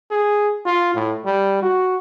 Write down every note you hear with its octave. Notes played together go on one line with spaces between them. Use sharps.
G#4
F4
A2
G3
F#4